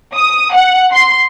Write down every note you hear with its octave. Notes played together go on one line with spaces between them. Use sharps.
D#6
F#5
C6